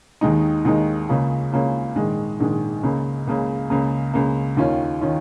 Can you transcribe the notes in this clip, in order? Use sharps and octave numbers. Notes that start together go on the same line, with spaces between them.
D#2 D#3 G#3 D#4
D#2 D#3 G#3 D#4
C#2 C#3 A#3 C#4 F4
C#2 C#3 A#3 C#4 F4
A#1 G#2 D#3 G#3
A#1 G#2 D#3 G#3
C#2 C#3 A#3
C#2 C#3 A#3
C#2 C#3 A#3
C#2 C#3 A#3
D#2 D#3 C#4 F4
D#3 C#4 F4